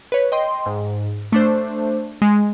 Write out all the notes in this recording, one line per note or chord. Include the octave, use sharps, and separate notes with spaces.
B4 C#5
D#5 G5 C6
G#2
A3 D4 C5
G#3